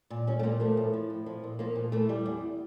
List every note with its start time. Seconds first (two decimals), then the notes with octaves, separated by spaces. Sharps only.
0.10 A#2
0.27 G3 C#4
0.39 A3
0.43 A#2 A#3
0.60 F3 A3
0.77 A2
0.93 F3
1.10 A2
1.26 F3
1.44 A#2
1.59 F3 A#3
1.76 A#2
1.92 E3 A3
2.09 G3
2.26 E2